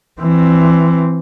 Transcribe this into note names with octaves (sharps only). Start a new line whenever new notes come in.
E3 C4